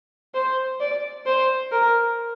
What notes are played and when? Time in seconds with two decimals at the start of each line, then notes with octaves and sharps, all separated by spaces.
0.34 C5
0.80 D5
1.26 C5
1.72 A#4